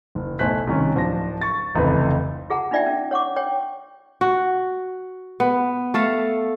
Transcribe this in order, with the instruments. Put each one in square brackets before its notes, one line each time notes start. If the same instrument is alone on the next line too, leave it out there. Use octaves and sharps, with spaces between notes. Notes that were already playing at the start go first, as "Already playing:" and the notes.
[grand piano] F#1
B1 A3 C5 G#5 F#6 B6
C2 D#3 C#4
D1 F3 D4 A#6
C#6 A6
F1 C#2 E3 C4 B4
[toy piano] F4 G#4 F#5 A5 A#5
D4 D#4 F4 D5 E5 G5
C#4
C#5 F#5 C#6 D6
C#5 G5
[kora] F#4
B3
A3 A4 F5